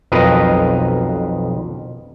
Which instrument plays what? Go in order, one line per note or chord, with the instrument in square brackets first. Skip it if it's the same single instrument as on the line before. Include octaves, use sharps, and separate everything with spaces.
[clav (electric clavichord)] B1 F2 A#4 B4 D#5 F5